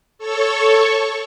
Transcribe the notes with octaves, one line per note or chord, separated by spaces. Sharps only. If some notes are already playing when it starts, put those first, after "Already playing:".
A4 C#5 C#6